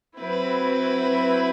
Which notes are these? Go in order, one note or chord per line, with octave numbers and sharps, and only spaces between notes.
F#3 C4 E4 B4